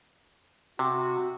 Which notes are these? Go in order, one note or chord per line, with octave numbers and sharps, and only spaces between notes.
C3 F#4